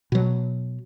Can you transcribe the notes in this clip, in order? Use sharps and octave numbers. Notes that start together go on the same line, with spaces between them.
B2 F#3